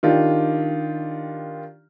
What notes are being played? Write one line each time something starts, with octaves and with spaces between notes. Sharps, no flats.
D#3 D4 F4 G4